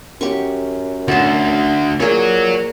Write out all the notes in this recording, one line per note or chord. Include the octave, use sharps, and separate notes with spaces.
F#2 G4 C#6
D2 F#4 A5
A#2 A#3 F#4 G#4 C#5